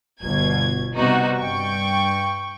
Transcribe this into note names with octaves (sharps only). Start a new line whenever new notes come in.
G1 B2 G#6
C3 G3 B3 D#4 F#4
G2 G5 C#6